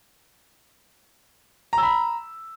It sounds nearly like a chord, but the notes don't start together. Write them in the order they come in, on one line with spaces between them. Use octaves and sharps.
A#5 E6 B5